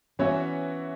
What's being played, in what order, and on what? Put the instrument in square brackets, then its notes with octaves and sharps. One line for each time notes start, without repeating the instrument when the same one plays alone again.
[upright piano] E3 B3 F#4 C#5 E5 [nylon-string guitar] C#4